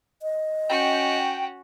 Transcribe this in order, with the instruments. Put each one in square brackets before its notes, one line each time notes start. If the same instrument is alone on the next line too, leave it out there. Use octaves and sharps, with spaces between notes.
[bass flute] D#5
[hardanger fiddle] C#4 F#4 [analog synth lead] G5